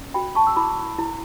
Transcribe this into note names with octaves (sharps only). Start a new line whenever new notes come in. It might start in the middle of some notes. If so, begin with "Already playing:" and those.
Already playing: C#4
F#4 G5 B5
A5 C#6
E6
E4 B5 D6
E4